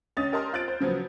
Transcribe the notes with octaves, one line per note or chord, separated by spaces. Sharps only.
C#2 C#4 D#5 D#6 A6
G4 A#4 D#5 A5 C6 F6
C4 F4 F#6 A6 D7
C5
C#3 F3 F#3 B3